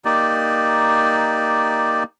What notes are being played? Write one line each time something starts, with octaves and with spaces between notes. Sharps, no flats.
A#3 D#4 G4 D5